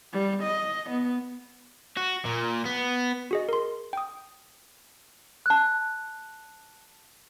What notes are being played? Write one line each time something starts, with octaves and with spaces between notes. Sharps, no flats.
G3
D#5
B3
F#4
A#2
B3
F#4 G#4 D#5
A#4 C6
G5 D#6
A5 F#6